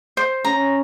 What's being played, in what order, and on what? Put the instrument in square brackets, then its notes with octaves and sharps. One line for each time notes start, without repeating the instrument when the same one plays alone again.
[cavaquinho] C5
[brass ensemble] C#4 [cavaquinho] A#5